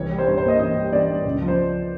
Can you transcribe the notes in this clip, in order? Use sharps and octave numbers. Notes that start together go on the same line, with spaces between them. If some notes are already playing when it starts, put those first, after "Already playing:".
Already playing: C2 E3 C#5
G3
C5
G2 C#5
C5
A#3
D#5
E3 D#5
G3
E3 D5
G2
C#2
F3
C5